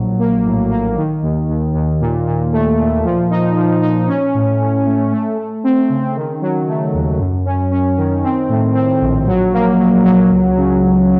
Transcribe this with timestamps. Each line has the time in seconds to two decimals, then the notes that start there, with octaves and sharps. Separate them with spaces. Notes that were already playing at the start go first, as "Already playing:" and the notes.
Already playing: A#1 F#3
0.19 A#3
0.45 A2
0.70 A#3
0.96 D#3
1.22 D#2
1.48 D#2
1.74 D#2
2.01 A#2
2.26 A#2
2.52 A3
2.78 A#2
3.04 F3
3.30 D#4
3.56 F3
3.82 D#4
4.08 C#4
4.34 A2
4.60 A2
4.86 A3
5.12 A3
5.38 A3
5.64 C4
5.89 C#3
6.15 D#3
6.41 F#3
6.67 A3
6.94 D#2
7.19 F#2
7.45 C#4
7.71 C#4
7.97 D#3
8.23 C4
8.49 A2
8.75 C4
9.01 A#1
9.27 F#3
9.53 A#3
9.79 F#3
10.05 F#3
10.30 C#2
10.56 C#3
10.83 C#2